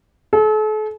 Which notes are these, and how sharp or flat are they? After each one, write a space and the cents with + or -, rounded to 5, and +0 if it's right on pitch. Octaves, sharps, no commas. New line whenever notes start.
A4 -40